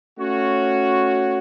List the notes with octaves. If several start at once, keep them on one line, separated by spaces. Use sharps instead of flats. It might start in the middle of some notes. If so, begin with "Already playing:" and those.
A3 C#4 F#4 C#5